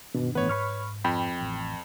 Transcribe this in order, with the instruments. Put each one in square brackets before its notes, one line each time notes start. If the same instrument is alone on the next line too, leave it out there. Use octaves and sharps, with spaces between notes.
[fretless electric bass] G1 D#3 D4 [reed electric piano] B2
[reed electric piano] A2 E3 B3 [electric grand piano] B4 C#5
[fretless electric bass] G#2 [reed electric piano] B5 C#6 F6
[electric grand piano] F2 [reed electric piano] G5 B5
[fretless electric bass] A1